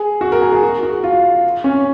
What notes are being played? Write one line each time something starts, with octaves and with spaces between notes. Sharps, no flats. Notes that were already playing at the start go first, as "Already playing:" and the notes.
Already playing: G#4
F#4
A#4
G#4
G#4
F#4
F#4
F4
C#4